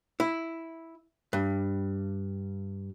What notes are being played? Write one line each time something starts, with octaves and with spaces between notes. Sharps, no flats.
E4
G2